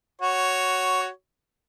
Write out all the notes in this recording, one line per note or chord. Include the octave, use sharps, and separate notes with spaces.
F#4 C#5